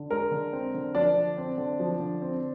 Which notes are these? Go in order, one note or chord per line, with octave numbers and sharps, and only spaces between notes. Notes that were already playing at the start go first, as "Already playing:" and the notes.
Already playing: D3
G#3 A#4
D3
C4
D3
F3 D4 D5
D3
C4
D3
F3
D3
C4